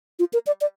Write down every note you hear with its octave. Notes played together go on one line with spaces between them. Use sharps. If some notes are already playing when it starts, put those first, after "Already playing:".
F4
A#4
D5
D5